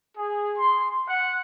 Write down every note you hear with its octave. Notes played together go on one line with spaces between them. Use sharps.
G#4
C6
F#5